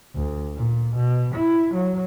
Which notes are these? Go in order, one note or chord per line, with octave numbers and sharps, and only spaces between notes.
D2
A#2
B2
E4
F#3